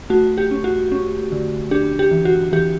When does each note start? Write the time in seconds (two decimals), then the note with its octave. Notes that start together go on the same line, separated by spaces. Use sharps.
0.10 A3 F#4
0.38 G4
0.51 C#4
0.64 F#4
0.92 C#4
1.32 D3
1.71 D4 G4
1.99 G4
2.11 E3
2.25 F#4
2.52 E3 G4